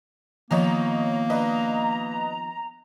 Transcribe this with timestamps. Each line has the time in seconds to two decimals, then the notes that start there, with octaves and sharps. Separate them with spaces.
0.51 D#3 F3 A#3 B3 C#5 D#5 A#5
1.30 D4 B4 D#5 A#5